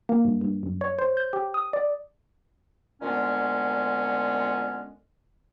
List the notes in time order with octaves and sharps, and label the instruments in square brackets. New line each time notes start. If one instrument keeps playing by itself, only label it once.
[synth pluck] A#3
G2
G2
F#2
C#5
C5
G6
G4
D#6
D5
[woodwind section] D2 A#2 D3 G#3 B3 C#4